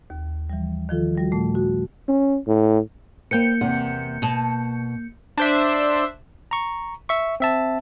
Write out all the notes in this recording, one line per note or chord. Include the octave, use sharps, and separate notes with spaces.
D#2
E3 F3 G3
D#3 F3 F4 A4
F3 G3 F#4
A#2 A3
F#4
C#4
A2
A#3 B4 C5 G5 G6 C#7
E2 C3 F#5
B2 A5
D4 C5 E5
A#5 C#6
E5 C#6
C4 E5 A5